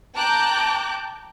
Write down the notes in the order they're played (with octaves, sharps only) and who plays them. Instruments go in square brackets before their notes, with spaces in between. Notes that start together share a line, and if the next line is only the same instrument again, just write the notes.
[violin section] G5 A5 A#5 D6 F#6 G6